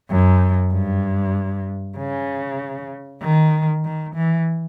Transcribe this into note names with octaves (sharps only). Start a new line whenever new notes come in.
F#2
G2
C#3
D#3
D#3
E3